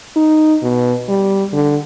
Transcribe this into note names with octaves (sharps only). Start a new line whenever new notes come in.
D#4
B2
G3
D3